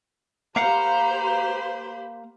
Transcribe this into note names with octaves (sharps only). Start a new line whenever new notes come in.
A#3 G4 C5 F5 F#5 A#5 B5